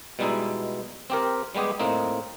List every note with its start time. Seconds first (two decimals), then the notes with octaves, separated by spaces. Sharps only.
0.19 B2 G3 G#3 D#4 E4
1.10 C4 G4 A#4
1.55 G3 G#3 B3 G4 G#4
1.79 A2 A#3 C4 D#4